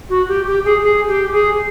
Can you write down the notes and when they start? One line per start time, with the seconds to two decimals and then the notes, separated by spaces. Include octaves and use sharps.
0.09 F#4
0.28 G4
0.46 G4
0.65 G#4
0.83 G#4
1.08 G4
1.32 G#4